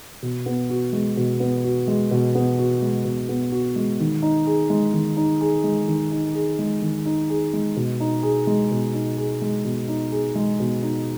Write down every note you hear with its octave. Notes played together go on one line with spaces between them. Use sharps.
B2
B3
F#4
G#3
B2
B3
F#4
G#3
B2
B3
F#4
G#3
B2
B3
F#4
G#3
D#3
D#4
G#4
G#3
D#3
D#4
G#4
G#3
D#3
D#4
G#4
G#3
D#3
D#4
G#4
G#3
B2
D#4
G#4
G#3
B2
D#4
G#4
G#3
B2
D#4
G#4
G#3
B2
D#4